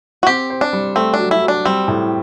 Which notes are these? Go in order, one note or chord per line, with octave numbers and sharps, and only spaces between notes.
F#4
C4 G4
C5
D4
G3
A3 C4
D4
F#3
E4
F#3
D4
G3 C4
A2